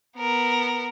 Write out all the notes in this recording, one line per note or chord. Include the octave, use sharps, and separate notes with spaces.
B3 A#4